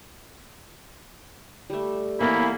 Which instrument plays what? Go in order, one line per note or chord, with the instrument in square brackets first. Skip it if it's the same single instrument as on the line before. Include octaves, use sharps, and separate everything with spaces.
[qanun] G3 A3
[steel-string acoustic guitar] E3 B3 C#4 [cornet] A#3 [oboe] E4